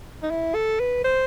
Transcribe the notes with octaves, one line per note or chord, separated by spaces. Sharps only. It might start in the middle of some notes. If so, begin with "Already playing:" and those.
D#4
E4
A4
B4
C5